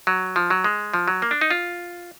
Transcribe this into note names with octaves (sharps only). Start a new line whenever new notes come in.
F#3
F3
F#3
G#3
F3
F#3
A#3
D4
D#4
F4